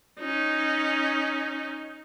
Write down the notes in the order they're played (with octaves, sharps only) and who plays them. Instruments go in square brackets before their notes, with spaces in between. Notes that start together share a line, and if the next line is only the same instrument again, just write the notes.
[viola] C#4 D#4